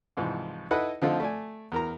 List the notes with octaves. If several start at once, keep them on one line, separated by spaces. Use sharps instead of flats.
C2 G#2 E3 F3
D#4 E4 A4 B4 D#5 F#5
D3 F3 C4 D#4 F4 A4
A3 D5 G#5
E2 A#4 A#5